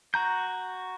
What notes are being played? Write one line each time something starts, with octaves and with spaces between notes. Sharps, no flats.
F#4 A#5 G6